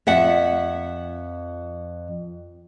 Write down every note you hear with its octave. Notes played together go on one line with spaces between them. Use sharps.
F2 E5 F#5